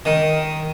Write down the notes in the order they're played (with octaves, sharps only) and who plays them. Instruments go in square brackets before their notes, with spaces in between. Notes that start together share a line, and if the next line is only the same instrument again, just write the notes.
[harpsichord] D#3